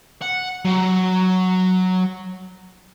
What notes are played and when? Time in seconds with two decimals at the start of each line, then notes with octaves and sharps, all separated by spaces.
0.22 F#5
0.65 F#3